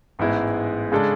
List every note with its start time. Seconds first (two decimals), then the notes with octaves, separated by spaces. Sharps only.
0.19 A1 G#2 G#3 B3 E4
0.92 C#3 G#3 D4 A4